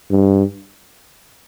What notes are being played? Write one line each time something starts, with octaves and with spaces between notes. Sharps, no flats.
G2